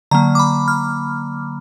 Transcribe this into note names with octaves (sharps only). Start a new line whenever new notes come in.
D3 F#3 A#3 A#5
D6
B5
F6